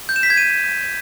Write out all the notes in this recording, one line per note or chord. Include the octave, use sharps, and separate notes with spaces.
G6
E7
B6
G#6
D#7